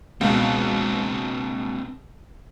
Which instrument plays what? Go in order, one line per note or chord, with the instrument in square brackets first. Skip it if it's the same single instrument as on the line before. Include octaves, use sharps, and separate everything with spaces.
[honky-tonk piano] C#2 B2 [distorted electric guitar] C4 D4